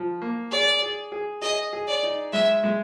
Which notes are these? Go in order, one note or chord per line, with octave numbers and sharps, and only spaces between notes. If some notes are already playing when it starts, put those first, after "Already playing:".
Already playing: F3
A#3
G#4 D5
G#4
G#4
G#4 D#5
G#4
D5
D#4
G#3 E5
G#3